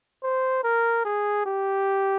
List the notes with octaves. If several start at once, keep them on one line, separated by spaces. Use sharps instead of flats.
C5
A#4
G#4
G4